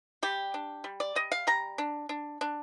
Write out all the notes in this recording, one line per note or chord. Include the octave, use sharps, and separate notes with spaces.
G3 G4
D4
G3
D5
G3 D#5
F5
G3 A#5
D4
D4
D4